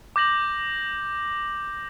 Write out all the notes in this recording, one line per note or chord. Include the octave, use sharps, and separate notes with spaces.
D6 G6 A#6 F#7